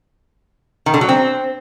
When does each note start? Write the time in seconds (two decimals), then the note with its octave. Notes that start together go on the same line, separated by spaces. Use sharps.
0.86 D#3
0.94 D3
1.01 F#3
1.09 C4